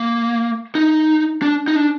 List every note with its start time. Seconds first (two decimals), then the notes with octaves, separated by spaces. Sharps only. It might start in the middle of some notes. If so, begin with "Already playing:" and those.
Already playing: A#3
0.75 D#4
1.42 D4
1.68 D#4
1.76 D4